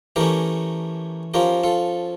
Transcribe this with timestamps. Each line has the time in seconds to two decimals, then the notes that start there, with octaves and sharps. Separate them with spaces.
0.16 E3 A3 C#4 G4 A#4
1.34 F3 C#4 F4 G4 A#4
1.64 F4 A4